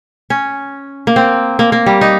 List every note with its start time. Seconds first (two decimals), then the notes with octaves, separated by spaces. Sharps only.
0.30 C#4
1.07 A#3
1.16 C4
1.59 A#3
1.72 A#3
1.86 G3
2.01 D#4